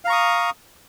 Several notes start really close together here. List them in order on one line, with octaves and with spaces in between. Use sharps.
F5 A#5 C#6 D#6